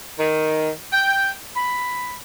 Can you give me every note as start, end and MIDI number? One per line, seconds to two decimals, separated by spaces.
0.19 0.70 51
0.92 1.31 79
1.56 2.15 83